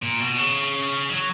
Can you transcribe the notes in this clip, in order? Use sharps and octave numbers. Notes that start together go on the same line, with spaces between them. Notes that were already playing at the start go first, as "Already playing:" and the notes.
A#2
B2
C#3
F#3